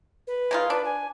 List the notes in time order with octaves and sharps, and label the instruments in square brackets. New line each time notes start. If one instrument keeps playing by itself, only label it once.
[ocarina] B4
[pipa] G#3 D#4 F4
[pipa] D4 [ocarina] B4
[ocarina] G#5